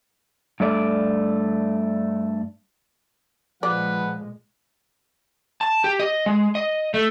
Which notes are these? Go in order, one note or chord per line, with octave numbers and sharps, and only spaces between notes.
G2 A3 D5
A#2 F3 G#3 B4 D5 F#5
A5
G4
D#5
G#3
D#5
A3